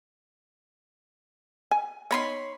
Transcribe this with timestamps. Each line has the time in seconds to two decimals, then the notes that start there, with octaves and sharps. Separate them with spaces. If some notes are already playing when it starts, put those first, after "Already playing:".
1.71 G#5
2.11 B3 D#4 C#5 B5 C6